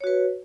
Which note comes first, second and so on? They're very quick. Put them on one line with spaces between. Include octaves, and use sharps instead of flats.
C#5 F#4 B4